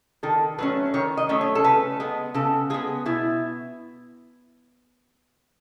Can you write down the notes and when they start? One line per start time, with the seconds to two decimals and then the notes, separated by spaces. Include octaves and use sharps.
0.23 D#3 A4
0.58 F#3 A3 C#4 B4
0.94 D#3 C#5
1.17 D#5
1.29 F#3 A3 C#4
1.41 C#5
1.55 A4
1.64 C#3 B4
2.00 G#3 B3
2.34 C#3 A4
2.70 G#3 B3 G#4
3.06 B2 E4